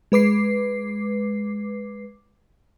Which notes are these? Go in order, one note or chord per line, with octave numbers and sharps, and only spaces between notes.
G#3 B4 D6 C7